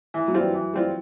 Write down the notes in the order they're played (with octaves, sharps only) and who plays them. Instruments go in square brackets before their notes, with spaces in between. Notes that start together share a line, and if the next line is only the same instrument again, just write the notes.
[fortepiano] E3
[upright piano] F#3
[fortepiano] G3 C4 F4
[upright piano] E3
[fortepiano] E3
G3 C4 F4